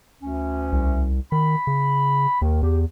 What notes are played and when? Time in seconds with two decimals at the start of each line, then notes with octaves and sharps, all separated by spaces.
0.23 D2 C#4
0.72 C2
1.32 D#3 B5
1.67 C#3
2.42 D#2 D#3
2.63 E2 G4